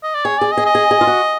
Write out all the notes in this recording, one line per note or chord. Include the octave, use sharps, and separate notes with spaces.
D#5
D5
G#4 C#5
G#4 D5
D#5
G#4
D#5
G#4
G#4
F4
F#4